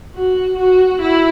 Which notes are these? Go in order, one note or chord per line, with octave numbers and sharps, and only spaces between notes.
F#4
F#4
E4